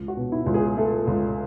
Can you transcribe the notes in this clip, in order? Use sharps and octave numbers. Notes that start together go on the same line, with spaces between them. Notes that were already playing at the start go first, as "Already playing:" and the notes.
Already playing: C#2
F#4
B2
E4
C#2
G#4
A3 A4
C#2